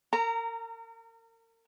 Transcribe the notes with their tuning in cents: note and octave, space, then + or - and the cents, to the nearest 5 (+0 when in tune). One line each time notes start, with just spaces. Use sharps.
A#4 -35 A#5 -15